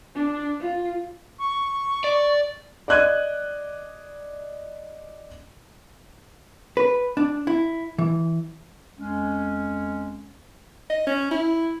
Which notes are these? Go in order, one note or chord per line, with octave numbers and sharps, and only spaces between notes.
D4
F4
C#6
D5
D5 D#5 F#6 G#6 D#7
B4
D4
E4
E3
F2 G#3 C#4
D#5
C#4
E4